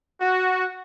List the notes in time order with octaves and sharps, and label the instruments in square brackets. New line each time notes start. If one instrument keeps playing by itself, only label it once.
[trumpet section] F#4